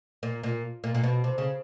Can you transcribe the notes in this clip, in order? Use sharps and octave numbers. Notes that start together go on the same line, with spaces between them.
A#2
A#2
A#2
A#2
B2
C3
C#3